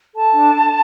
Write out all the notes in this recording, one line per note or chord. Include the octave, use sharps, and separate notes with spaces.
A4 A5
D4
D4